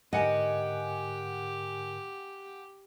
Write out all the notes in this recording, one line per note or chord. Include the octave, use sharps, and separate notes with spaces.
G#2 D3 G4 A#4 D#5 F#5 G#5 C#7